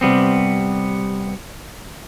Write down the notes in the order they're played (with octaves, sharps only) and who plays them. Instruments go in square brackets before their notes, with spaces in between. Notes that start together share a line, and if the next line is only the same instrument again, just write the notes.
[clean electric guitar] C3 G3 B3 C4